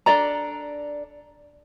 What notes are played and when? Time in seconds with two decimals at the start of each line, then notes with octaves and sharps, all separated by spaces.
0.06 D4 A4 D5 A#5